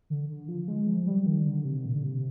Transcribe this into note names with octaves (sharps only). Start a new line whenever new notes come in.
D3
D3
F3
G#3
F3
G3
D#3
D3
C3
A#2
D3
C3